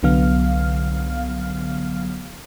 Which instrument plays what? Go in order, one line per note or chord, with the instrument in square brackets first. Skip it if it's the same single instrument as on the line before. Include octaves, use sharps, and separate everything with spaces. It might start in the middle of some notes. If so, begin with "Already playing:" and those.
[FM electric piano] C2 D3 F#3 B3 F5 F6